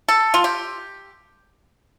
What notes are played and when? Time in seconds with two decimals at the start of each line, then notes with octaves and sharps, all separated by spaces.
0.08 A4
0.34 F4
0.44 G4